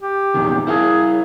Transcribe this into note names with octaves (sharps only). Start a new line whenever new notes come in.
G4
E2 A#2 D#3
E4 G#4 A#4 F5